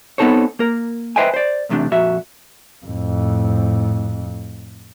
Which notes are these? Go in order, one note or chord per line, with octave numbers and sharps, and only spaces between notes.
B3 C4 D#4 A4 C5 C#5
A#3 A#4
B4 C5 D#5 E5 G5 G#5
C5 D5
B1 E2 C3 A3 D4
F2 A#2 F#4 E5
F2 A2